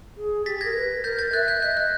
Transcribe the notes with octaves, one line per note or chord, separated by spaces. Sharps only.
G#4
G4 A6 B6
A#4 G#6 A#6
B4
A#4 G6 A6
G6 A6
E5 F#6 G#6
G6
D#5 G6
F#6